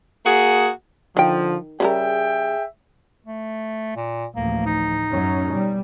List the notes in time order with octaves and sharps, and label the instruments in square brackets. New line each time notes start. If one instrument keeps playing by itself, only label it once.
[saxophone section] A#3 F#4 G#4
[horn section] D3 F3 [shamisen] D#3 G5
[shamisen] C#3 G3 A#4 [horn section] G#4 E5 G5
[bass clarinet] A3
A#2
[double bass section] A1 D2 F3 [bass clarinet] A#3
[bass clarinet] D#4
[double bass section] F#2 F#3 C#4
B2 G3